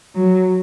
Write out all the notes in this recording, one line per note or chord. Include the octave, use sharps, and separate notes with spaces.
F#3